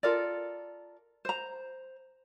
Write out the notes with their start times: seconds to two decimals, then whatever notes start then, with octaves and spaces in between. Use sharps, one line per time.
0.03 F4 A4 A#4 D5
1.25 C5 A#5